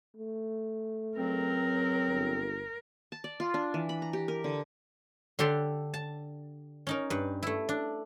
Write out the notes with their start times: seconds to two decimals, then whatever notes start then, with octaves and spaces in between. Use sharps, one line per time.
0.17 A3
1.18 C#2 F#3 C4 A#4
2.09 G1
3.12 A5
3.24 D5
3.40 F4
3.54 D4
3.74 E3
3.89 B5
4.02 A#5
4.13 G4
4.28 A#4
4.44 D3
5.39 D3 D4 G4 A4 C6
5.94 A5
6.87 C#4 D#4 A#4
7.10 G2 B4
7.43 A3 E4
7.69 D4